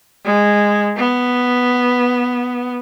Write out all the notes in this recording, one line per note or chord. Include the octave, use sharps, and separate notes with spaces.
G#3
B3